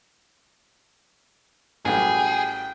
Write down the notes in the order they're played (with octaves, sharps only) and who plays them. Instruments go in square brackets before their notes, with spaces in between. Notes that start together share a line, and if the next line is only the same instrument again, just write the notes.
[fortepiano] A1 F#3 G3 [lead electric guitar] G#4 [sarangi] G5